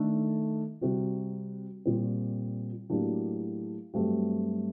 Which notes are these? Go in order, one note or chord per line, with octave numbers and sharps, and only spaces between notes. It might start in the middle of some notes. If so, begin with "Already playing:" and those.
Already playing: D#3 A3 D4 A4
C3 G3 C4 F#4
A#2 G3 C4
A2 F#3 A#3 D4 G4
G2 F#3 A3 C4 G4